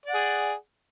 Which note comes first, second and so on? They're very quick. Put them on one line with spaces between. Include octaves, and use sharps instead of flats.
D5 F#5 G#4